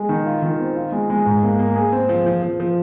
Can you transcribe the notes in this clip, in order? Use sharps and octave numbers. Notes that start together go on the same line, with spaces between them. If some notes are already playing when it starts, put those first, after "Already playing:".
Already playing: G#3 G#4
D#3
F4
D#3
C4
F4
G#3
G#3
G#2
A#3
A#3
G#4
C4
F3
F3
F3
F3